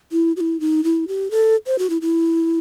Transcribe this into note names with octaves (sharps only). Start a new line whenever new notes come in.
E4
F#4
E4
D#4
E4
G4
A4
C5
F#4
E4
E4